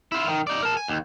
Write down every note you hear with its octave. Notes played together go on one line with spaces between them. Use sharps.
E4 F4
D#3
D#4 D5
A#4 A5
G#5
D#2